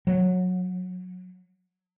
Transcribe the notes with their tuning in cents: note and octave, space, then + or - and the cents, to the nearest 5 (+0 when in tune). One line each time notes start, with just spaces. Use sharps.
F#3 -20